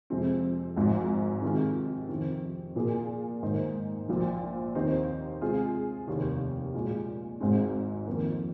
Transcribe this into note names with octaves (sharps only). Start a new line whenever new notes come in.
F2 C3 G#3 C4
G#1 G#2 F3
C3 D#3 G#3 F4
F2 C3 D#3 C4
A#2 A#3 G#4
G#2 D#3 A#3 D#4 C5
A#1 A#2 F3
D#2 D#3 C4 D#4 C5
C3 G#3 F4 G#4
F1 D#2 D#3
A#2 G#3 F4
G#1 G#2 G#3 C4
F2 D#3 A#3